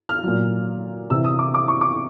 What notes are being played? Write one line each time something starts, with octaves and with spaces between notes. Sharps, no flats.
F6
A#2 F#3
C3 E3 E6
D#6
D6
D6
C#6
D6